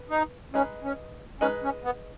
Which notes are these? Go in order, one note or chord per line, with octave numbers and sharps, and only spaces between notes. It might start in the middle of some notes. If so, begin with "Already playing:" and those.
Already playing: B4
D#4
G#3 C#4 D#4 B4
C#4
G#3 C#4 D#4 B4
C#4
B3